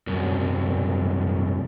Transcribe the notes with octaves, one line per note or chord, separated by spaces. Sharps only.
C2 F#2